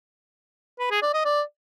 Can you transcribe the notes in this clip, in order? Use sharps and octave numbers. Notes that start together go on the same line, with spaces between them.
B4
G#4
D5
D#5
D5